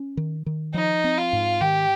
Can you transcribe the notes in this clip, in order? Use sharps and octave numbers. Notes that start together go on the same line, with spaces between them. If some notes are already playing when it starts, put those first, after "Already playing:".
Already playing: C#4
D#3
D#3
F3 D#4
C4
F4
G#2
D#3 G4